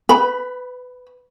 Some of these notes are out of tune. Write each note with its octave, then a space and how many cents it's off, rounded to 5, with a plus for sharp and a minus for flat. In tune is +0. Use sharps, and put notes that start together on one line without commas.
B4 +20 B5 -10